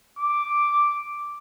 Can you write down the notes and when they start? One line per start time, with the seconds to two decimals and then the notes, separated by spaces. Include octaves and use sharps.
0.19 D6